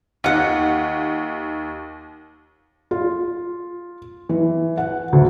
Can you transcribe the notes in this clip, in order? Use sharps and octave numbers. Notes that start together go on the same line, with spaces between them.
D#2 F4 F#5 C#7
F4
E3
F#5
D2